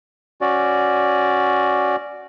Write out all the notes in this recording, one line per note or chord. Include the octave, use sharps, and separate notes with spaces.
C#4 F#4 D5